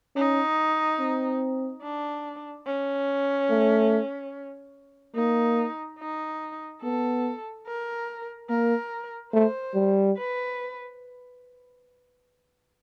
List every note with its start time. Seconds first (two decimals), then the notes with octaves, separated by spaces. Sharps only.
0.16 C#4 D#4
0.99 C4
1.82 D4
2.66 C#4
3.50 A3
5.16 A#3 D#4
5.99 D#4
6.83 B3 A4
7.67 A#4
8.50 A#3 A#4
9.33 A3 C5
9.74 G3
10.17 B4